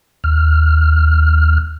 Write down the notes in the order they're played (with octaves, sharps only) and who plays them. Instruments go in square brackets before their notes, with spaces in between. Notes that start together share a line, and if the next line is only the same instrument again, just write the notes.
[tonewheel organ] D#2 F6